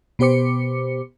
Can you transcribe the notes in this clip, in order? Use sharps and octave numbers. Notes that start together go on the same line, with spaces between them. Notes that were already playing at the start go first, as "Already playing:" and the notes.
B2 B3 G4 C5 D6 C#7